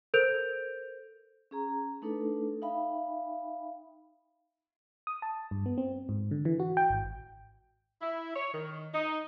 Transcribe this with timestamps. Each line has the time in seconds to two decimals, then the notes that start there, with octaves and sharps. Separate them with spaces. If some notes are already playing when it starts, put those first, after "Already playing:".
0.14 A4 A#4 C5 G6 D7 F7
1.51 C#4 G#4 A#5
2.02 A3 D4 D#4 A4 B4
2.62 D#4 E5 F5 G5 B5
5.07 D#6
5.22 A5
5.51 G2
5.66 B3
5.78 C4
6.09 G#2
6.31 D3
6.45 E3
6.60 F#4
6.77 G5
6.90 G#1
8.00 E4
8.35 C#5
8.52 D#3
8.93 D#4